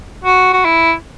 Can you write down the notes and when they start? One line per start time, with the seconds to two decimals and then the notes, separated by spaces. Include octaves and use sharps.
0.24 F#4
0.53 F#4
0.65 E4